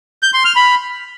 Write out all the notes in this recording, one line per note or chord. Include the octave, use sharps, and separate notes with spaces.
G6
C6
F6
B5